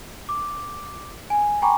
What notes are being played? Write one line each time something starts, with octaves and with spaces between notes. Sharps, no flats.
D6
G#5
G5 G#5 A#5 B5 C#6 D6